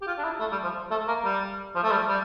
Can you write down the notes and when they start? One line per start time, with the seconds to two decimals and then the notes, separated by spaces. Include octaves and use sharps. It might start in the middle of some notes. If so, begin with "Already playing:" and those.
0.02 G4
0.07 F4
0.18 D4
0.24 E4
0.40 A3
0.52 G3
0.64 F3
0.91 A3
1.08 A#3
1.25 G3
1.75 F3
1.84 A3
1.92 G3
2.08 G3